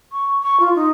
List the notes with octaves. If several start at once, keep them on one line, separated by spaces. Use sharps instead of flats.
C#6
C#6
F4
D#4